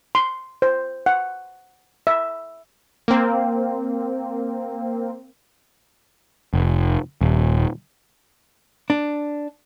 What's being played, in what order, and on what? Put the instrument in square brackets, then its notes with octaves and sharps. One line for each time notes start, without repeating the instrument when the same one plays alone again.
[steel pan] C6
C5
F#5
E5
[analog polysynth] A#3 C4
[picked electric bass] F1
D#1
[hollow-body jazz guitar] D4